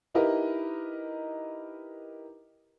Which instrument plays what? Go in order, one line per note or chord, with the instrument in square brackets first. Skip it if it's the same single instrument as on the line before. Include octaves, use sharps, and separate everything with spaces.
[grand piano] D#4 E4 G4 A#4 B4 D#5